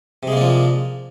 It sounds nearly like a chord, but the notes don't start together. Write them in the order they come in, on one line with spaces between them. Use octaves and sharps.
C3 G#3 A#3 D4 F3